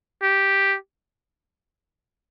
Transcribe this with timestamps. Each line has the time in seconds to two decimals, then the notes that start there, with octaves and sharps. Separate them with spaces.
0.22 G4